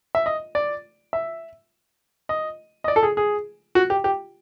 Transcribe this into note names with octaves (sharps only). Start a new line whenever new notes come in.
E5
D#5
D5
E5
D#5
D#5
D5
A4
G#4
G#4
F#4
G4
G4